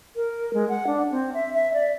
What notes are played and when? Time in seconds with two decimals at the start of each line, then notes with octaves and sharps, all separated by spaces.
0.16 A#4
0.54 G#3
0.69 F#5
0.87 D4
1.11 C4
1.34 E5
1.54 E5
1.74 D5